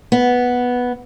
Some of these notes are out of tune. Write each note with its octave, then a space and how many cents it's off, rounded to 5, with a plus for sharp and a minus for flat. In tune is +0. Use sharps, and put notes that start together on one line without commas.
B3 -5